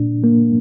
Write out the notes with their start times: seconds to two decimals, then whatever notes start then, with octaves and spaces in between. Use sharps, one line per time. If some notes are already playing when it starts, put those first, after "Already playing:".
Already playing: A#2 D4
0.24 A#3